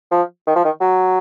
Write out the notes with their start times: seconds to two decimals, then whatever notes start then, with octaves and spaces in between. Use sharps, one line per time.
0.12 F3
0.47 D#3
0.56 F3
0.65 D#3
0.81 F#3